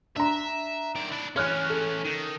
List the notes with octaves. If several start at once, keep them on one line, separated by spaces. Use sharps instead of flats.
D4 E5 A#5
D#3 D5
D4 E4
E3 C#4 C#5 F6 F#6
A4
D#3